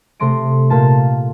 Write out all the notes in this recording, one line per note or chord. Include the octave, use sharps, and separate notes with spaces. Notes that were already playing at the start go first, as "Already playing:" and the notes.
C3 A3 C6 A#6 D7
A#2 A#3 F4 A5 B6